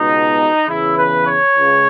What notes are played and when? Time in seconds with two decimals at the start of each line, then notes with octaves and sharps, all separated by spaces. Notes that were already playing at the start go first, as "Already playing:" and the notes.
Already playing: C#2 B2 D#4
0.68 E2 C#3 E3 E4
0.97 B4
1.27 C#5
1.57 C#2 C#3